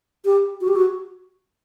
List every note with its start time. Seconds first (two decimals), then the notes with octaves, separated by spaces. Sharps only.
0.25 G4
0.61 F#4
0.68 G4
0.76 F#4